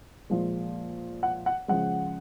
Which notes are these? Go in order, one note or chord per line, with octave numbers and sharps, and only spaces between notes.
A#2 F3 G#3
F#5
F#5
C#3 F3 G#3 F#5